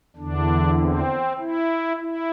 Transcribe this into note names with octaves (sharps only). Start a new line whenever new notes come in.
E2 D3 D4
C4
E4
E4